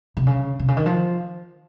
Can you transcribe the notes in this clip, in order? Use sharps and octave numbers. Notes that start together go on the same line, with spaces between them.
C3
C#3
C3
C#3
D#3
F3